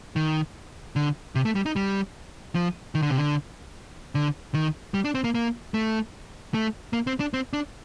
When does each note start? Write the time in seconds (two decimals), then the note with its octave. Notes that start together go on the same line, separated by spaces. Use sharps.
0.16 D#3
0.96 D3
1.35 C3
1.45 A3
1.55 G3
1.66 D#4
1.76 G3
2.55 F3
2.95 D#3
3.02 D3
3.10 C3
3.17 D3
4.15 D3
4.54 D#3
4.94 G3
5.05 D4
5.15 C4
5.24 A#3
5.35 A#3
5.74 A3
6.54 A3
6.93 A#3
7.07 C4
7.20 D4
7.34 C4
7.53 D4